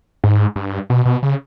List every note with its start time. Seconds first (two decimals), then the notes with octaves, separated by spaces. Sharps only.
0.24 G#2
0.56 G2
0.90 B2
1.05 B2
1.23 C#3